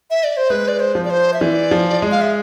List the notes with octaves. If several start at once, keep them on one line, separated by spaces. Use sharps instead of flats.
E5
D5
C5
G#3 B4
D5
C5
F3
D5
C5
E5
E3 D5
F3
G#3
F5
E5